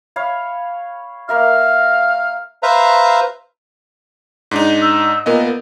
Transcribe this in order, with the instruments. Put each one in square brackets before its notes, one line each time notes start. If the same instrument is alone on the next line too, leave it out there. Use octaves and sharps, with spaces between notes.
[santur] C#5 F5 B5
[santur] A#3 A#4 E5 [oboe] F5
[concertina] B4 C5 E5 F5 A#5
[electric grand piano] G#2 D4 D#4
[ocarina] E6
[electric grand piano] A#2 B3 D#5 [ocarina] A#4